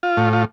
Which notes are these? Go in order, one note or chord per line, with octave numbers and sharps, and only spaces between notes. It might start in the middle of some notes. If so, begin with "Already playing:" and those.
F4
A2
F4